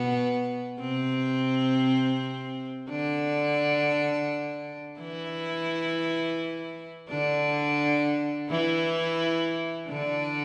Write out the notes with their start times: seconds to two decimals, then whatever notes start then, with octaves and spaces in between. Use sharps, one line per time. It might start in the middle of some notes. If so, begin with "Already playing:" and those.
Already playing: B2 B3
0.80 C3 C4
2.90 D3 D4
5.00 E3 E4
7.10 D3 D4
8.49 E3 E4
9.90 D3 D4